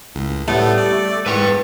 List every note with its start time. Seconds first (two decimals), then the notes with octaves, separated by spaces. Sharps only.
0.15 C#2 A2
0.48 A2 G3 A3 B3
0.78 D5
1.26 E2 G#2 B4 G5 C#6